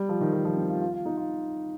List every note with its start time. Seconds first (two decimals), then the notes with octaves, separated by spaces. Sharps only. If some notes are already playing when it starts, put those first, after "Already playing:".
Already playing: G3
0.09 F3
0.21 D#3
0.33 F3
0.45 F3
0.57 C4
0.70 F4
0.81 F4
0.93 F4
1.05 D#4
1.17 F4